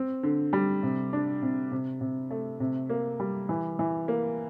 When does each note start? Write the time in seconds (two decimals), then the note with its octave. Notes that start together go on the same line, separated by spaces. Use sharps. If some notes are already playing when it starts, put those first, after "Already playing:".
Already playing: C4
0.23 D3
0.53 G3
0.83 C3
1.13 D4
1.42 C3
1.71 C3
2.01 C3
2.31 A3
2.60 C3
2.90 A#3
3.20 G3
3.49 E3
3.79 E3
4.08 A#3